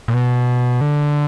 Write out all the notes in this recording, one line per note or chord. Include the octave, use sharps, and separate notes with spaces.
A#2
B2
D3